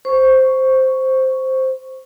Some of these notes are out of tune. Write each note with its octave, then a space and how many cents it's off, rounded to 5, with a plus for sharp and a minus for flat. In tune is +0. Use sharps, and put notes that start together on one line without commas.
C5 +0 C#6 +0